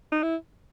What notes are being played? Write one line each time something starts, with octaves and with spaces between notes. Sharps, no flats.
D#4
E4